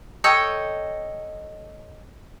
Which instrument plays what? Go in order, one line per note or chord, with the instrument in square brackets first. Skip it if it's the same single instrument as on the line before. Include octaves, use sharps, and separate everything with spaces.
[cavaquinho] A4 C#5 D#5 G5